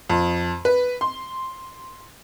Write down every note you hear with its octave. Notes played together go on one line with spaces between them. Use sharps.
F2
B4
C6